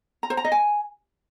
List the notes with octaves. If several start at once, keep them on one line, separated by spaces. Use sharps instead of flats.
A#5
C5
A#5
D#5
G#5